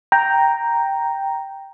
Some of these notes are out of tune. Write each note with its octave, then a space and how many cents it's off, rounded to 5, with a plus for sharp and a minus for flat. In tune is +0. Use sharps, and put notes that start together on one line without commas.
G5 +0 A#5 +0